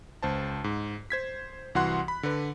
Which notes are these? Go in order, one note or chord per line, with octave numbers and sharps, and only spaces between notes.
C#2 C5 A5
G#2
C5 G#6 B6
C2 E3 F#4 F#5 C6 F#6
B5
D3 B4